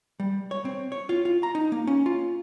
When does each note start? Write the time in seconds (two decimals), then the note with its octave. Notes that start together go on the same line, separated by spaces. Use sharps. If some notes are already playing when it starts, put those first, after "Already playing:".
0.20 G3
0.51 C#5
0.65 C4
0.92 C#5
1.09 F4
1.25 F4
1.43 A#5
1.55 D#4
1.72 A#3
1.87 C#4
2.06 F4